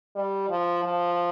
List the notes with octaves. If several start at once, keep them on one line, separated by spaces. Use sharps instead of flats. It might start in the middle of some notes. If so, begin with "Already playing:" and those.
G3
F3
F3